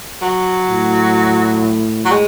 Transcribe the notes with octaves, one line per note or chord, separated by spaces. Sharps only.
F#3
A2
F#3
G#3